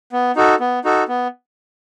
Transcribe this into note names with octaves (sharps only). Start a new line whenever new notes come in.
B3
D#4 F#4 A4
B3
D#4 F#4 A4
B3